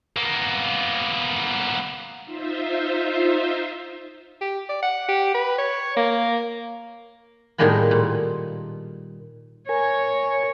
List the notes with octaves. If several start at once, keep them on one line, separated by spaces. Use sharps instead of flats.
A#3 B3
D#4 F4 C5 E5
G4
D5
F#5
G4
B4
C#5
A#3
A2 D#3 G3 G#3 A#3 B3
A#2
A#4 C#5 G#5